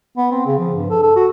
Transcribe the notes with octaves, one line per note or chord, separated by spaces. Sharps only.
B3
C4
C#3
F3
G2
A4
A4
F#4